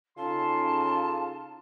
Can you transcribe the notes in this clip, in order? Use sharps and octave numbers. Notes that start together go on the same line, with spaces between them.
C#3 D#4 F4 A4 A5 C6